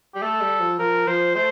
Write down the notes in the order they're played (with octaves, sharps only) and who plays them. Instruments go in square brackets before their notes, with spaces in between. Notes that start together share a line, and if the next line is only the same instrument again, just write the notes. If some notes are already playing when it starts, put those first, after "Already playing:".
[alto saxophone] G3 [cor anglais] G4
[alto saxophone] A3 [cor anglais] A4
[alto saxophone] G3
F3
[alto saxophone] F3 [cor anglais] A#4
[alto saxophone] F3 [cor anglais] C5
[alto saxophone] A3 [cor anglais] C5